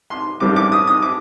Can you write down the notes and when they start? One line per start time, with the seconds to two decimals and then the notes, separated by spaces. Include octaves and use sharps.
0.10 C6
0.40 A1 G2 D#3 G3 C4 D6
0.56 D6
0.72 D#6
0.87 D#6
1.02 D6